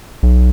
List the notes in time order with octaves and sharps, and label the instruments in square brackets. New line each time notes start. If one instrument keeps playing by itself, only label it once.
[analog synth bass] B1